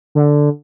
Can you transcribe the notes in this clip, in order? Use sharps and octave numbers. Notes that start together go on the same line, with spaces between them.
D3